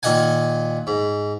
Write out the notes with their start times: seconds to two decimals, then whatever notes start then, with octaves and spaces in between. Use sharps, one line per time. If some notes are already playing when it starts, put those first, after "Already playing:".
0.03 A#2 D#3 D#5 F#5 G#5
0.87 G#2